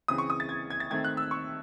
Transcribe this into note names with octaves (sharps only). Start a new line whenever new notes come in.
C#3 E3 C4 D#6
C#6
D#6
A6
G#6
G#6
A6
D#3 A3 C4 G#6
F#6
E6
C#6